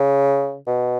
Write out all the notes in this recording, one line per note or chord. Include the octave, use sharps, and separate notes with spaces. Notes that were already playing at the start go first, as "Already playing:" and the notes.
Already playing: C#3
B2